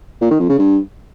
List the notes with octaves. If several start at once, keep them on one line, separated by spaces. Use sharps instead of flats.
A#2
D#3
F2
C#3
G2